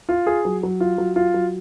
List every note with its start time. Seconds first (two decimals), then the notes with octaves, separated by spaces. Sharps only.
0.09 F4
0.27 G#4
0.45 F#3
0.63 F#3
0.80 F4
0.98 F#3
1.16 F4
1.34 F#3